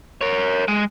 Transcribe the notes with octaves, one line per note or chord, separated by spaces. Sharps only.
A#4 C#5
G#3